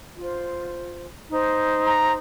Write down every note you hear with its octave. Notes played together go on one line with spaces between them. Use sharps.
F4 C5
D#4 C5
A#5